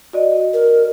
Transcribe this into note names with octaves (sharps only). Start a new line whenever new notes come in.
F#4 D5 D#5
A#4